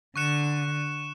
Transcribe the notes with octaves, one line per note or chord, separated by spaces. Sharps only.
D3 C#6 F#6 C#7 E7